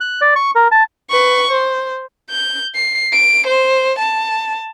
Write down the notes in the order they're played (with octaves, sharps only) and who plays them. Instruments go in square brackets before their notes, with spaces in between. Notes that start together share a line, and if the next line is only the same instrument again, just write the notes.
[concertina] F#6
D5
C#6
A#4
A5
[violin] B4 C#6
C5
G6
C7
D7
C5
A5